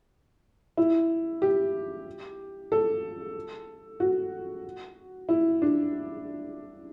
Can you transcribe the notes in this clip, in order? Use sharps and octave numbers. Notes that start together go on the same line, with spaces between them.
E4
G4
A4
F#4
E4
D4